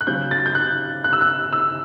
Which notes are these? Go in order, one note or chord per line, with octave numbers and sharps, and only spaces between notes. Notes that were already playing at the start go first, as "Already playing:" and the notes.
F#6
C#3 F#3 C#4 G6
A6
G6
F#6
F#6
E6
F#6
E6